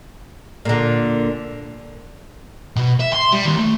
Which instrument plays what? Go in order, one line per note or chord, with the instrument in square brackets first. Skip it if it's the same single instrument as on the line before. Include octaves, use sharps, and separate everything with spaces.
[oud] A#2 D3
[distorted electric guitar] B2
E5
C6
G3
D#2
A3